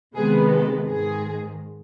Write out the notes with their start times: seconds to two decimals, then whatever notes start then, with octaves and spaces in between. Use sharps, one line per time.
0.15 C3 D#3 G#3 B3 G#4
0.52 A4
0.89 G#2 D#3 G#3 G#4